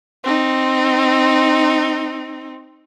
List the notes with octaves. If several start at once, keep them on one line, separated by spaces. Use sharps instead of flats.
C4 D#4